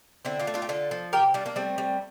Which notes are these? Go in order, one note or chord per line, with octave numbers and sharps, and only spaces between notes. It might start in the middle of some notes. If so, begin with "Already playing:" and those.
D3 C4 E4
D4 F4
A3
D4 F4
G4
D3 F4 A4
F3
C3 G4 A#4
G3 D4 F4
A#3 D4
G3 A3 C4
G3